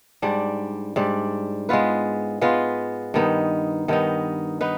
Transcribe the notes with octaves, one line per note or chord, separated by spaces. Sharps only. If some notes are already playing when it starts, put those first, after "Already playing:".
G#2 G3 D4
G#2 G3 D4
G#3 B3 F4 B4
G#3 B3 F4 B4
G2 D#3 B3 D#4
G2 D#3 B3 D#4
B3 D#4 B4